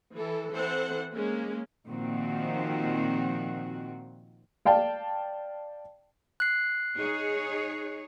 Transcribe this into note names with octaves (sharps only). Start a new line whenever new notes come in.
E3 A4
E3 C4 A4 C5 F#5
G#3 A#3 C#4
A#2 D#3 F3 C4 F#4
D5 F5 G5 A5
F#6 C7
D#4 G#4 C#5